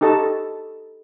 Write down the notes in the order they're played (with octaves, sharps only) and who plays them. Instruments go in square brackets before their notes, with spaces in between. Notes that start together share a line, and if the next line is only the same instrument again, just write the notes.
[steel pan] D#4 G4 A4 D#5 A5 C#6